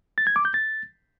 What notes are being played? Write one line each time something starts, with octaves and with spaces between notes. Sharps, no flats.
A6
G#6
D6
G6
A6